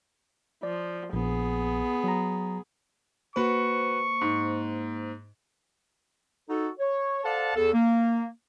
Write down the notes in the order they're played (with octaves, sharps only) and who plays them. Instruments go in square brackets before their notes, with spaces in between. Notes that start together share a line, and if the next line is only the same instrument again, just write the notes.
[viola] F3 [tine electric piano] D5
[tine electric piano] A#1 [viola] B3 G#4
[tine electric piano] F#3 A#5
[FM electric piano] A#3 C5 [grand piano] F#4 B4 [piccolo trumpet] C#6
[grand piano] G#2
[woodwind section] D#4 F#4 A4
C#5
A4 C5 D5 F5 F#5 A5
E2 A4
A#3